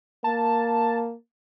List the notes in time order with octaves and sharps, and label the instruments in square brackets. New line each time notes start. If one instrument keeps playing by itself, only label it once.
[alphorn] A#3 [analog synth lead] A5